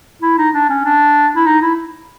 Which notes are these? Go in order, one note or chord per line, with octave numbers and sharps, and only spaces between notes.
E4
D#4
D4
C#4
D4
E4
D#4
E4